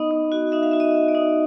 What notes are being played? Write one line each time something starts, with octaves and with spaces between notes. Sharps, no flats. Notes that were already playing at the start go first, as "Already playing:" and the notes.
Already playing: B3 D#4 D#5
D#4
F#4
D#4 E5
F5
F#4 E5
D#5
F#4
D5
D#4